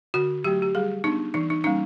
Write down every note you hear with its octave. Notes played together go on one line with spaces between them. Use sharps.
D3 F#4
F#3 A3 G4
G4
G3 G#4
B3 D4 D#4
E3 D#4
D#4
G3 A#3 C#4 D#4